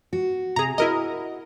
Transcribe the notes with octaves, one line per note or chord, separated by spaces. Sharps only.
F#4
C3 G#4 A#5
E4 F#4 A#4 D#5